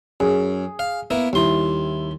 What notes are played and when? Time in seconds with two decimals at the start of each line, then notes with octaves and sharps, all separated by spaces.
0.20 F#2 G#4
0.79 F5
1.10 A#3 B3 E4
1.33 D#2 G3 E4 C6